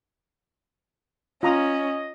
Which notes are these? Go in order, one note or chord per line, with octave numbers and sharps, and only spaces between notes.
C#4 F4 D#5 A#5 D#6